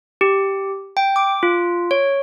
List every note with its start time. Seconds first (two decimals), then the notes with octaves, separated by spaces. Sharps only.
0.21 G4
0.97 G5
1.16 D6
1.43 F4
1.91 C#5